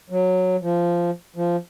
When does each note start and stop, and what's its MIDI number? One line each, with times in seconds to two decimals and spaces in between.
0.10 0.56 54
0.61 1.10 53
1.36 1.56 53